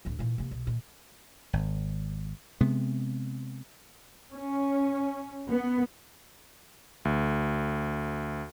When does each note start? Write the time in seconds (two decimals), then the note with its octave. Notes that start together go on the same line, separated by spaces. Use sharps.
0.05 A1 D2
0.19 A#2 E3
0.38 C3 A#3
0.51 B1
0.67 A#2 D#3
1.53 G#1
2.61 C3 G#3 B3
4.32 C#4
5.50 B3
7.05 D2